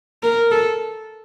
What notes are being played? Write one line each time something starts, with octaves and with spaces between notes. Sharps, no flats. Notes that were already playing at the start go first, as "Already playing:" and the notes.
A#4
A4